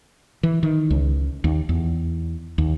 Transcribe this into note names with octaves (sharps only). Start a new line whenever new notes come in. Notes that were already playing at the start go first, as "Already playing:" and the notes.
E3
D#3
C#2
D#2
E2
D#2